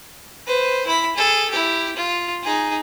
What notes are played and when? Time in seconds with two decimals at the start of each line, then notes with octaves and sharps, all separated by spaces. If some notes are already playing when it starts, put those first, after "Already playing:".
0.46 B4 C5
0.87 E4 B5
1.16 G#4 A4
1.51 E4 G4
1.96 F4
2.43 D#4 G#4